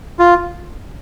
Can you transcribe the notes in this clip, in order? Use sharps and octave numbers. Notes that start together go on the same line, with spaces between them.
F4